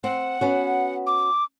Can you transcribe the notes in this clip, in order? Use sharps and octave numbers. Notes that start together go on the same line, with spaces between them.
C4 F#5
B3 C#4 F#4
D6